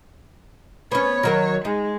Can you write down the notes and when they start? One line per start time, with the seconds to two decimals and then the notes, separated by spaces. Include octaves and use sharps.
0.92 B3 C#4 C#5
1.23 D#3 F#3 A#4
1.65 G#3 D#4